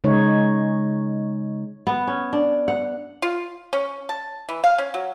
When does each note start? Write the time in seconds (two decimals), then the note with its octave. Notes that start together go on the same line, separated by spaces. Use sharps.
0.04 C#3 G#3 D#4 C#5
1.87 B3
2.07 C#4
2.33 D4
2.68 F#5
3.22 F4
3.73 C#4
4.09 A5
4.49 E3
4.64 F5
4.78 C#4
4.94 F#3